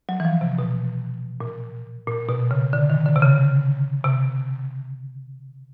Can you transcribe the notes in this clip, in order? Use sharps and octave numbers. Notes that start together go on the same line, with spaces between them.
F#3
E3
F3
C3
B2
A#2
A#2
B2
C#3
D3
D#3
D3
C3
C#3
C3